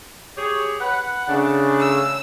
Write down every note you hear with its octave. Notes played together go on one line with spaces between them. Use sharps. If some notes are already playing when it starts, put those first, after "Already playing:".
G4 G#4 C#5
B4 F#5
C#3 A3 D4
E6